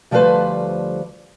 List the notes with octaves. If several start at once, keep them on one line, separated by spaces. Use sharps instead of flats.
D2 F3 G3 A3 B4 C5